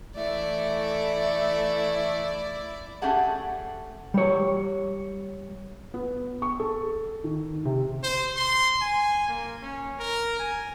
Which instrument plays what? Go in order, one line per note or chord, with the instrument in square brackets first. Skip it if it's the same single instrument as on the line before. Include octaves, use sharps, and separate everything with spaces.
[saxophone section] E3 A3 [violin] E4 D5
[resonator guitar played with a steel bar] A3 C#4 G4 G#4 F#5 A5
[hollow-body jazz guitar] G3 C#5
[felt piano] B3
C#6
A4
D#3
C3
[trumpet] C5
C6
G#5
A#3
C#4
A#4
G#5